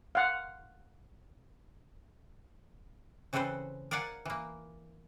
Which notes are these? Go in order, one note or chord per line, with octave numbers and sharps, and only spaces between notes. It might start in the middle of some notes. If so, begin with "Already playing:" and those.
F5 F#5
C#3 E3 C4 A4 B4 C5
A#4 D5 F5 F#5 G#5
E3 A#3